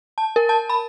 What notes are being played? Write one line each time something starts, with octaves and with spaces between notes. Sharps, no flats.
A5
A#4
A5
B5